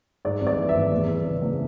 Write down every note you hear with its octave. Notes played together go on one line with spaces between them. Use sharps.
G#2 D5
G#1
D5
E3
E5
G#1
E2
E3
C#3
F#1